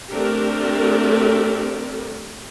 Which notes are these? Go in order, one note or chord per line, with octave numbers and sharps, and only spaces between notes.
A3 C4 D4 G4 A#4